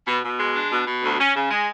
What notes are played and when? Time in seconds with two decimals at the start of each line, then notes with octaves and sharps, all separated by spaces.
0.07 B2
0.23 B2
0.39 G#3
0.55 D4
0.71 B2
0.87 B2
1.03 D2
1.19 C#4
1.35 C#3
1.51 G#3